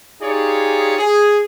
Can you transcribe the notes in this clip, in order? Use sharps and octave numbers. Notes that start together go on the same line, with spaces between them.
D#4 F4 G4 G#4 C#5 D5
G#4